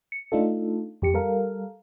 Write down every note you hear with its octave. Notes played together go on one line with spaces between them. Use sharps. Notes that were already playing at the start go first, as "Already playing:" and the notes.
C#7
A3 D4 D#4 F4 A4
F2 G4 C#7
G3 A4 A#4 F5